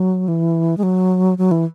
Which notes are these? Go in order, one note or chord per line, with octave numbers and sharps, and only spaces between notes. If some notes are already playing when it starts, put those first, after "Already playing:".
Already playing: F#3
E3
G#3
F#3
F#3
E3